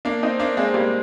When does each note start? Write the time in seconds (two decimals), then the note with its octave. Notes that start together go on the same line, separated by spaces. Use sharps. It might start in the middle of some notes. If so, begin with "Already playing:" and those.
0.05 A#3 D4
0.23 C4 D#4
0.39 A#3 D4
0.57 G#3 C4
0.74 G3 A#3